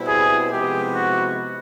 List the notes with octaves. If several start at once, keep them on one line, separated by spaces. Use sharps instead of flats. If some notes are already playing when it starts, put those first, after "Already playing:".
Already playing: B2 G3 C4 E4
G#4
C3 F3 G#3 B3 E4 G4
F#4